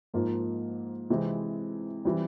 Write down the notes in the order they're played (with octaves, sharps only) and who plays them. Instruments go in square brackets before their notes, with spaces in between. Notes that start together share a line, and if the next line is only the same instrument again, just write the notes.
[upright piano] G#2 F3 A#3 F4
C3 E3 G#3 C4
E3 G3 C4